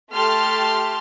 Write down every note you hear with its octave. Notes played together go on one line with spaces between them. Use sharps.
A3 G4 A4 A5 C6 F6